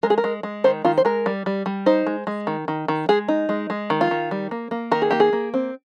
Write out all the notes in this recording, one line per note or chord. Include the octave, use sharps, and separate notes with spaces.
G#3 A#4
G#4
A#4
G#3
G#3
D#3 C5
D#3 F4
C5
G#3 A#4
G3
G3
G3
D#4 C5
G#3
G#3
D#3
D#3
D#3
G#3 G#4
D#4
G#3
G#3
D#3
F4
D#3
G3
A#3
A#3
D#3 A#4
G#4
A#3 G4
G#4
A#3
C4